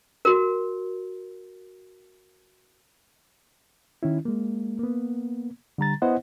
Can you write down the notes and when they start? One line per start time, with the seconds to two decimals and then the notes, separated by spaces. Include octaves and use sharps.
0.25 F#4 A#4
4.03 D#3 C#4 E4
4.25 G#3 A#3
4.79 A#3 B3
5.78 D3 G3 A#5 A6
6.02 B3 E4 C5 D#5 F#5